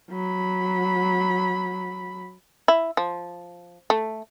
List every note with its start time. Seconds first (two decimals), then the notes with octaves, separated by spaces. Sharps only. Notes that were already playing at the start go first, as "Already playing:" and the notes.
0.11 F#3 B5
2.68 E4
2.97 F3
3.90 A3